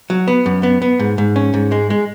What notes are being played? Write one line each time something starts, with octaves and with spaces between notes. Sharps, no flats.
F#3
B3
F#2
B3
B3
G#2
G#2
C#4
G#2
G#3
G#3